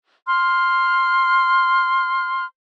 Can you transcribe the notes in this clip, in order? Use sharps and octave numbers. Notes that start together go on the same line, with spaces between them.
C6 F6